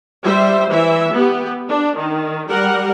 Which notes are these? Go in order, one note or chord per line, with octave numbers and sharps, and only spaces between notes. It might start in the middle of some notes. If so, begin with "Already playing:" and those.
G3 C5 E5
E3 E5
B3 G4
D4
D#3
G3 A#4 F#5